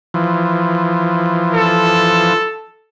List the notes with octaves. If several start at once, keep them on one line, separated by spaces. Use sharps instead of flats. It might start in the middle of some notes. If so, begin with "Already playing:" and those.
E3 F3
A4